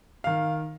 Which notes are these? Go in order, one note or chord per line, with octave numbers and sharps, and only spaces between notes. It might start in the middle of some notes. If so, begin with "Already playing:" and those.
D#3 F5